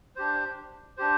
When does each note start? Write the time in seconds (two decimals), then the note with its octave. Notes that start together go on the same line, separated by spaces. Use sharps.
0.16 D4 G4 C5
0.97 D4 G4 C5